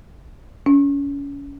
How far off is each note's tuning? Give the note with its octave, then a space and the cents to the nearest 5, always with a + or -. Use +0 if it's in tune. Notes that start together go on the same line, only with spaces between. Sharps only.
C#4 +30